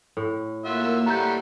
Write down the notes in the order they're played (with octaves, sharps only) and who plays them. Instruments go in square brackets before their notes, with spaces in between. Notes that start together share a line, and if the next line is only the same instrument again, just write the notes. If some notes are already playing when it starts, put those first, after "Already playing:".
[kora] A2 [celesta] A4
[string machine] A#3 E6 [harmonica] F4 F#4 E5
[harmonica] G3 A3 F#5 [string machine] G5 [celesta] A#5 G6